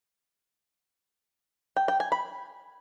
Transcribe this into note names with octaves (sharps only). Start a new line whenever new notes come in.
G5
G5
G#5
B5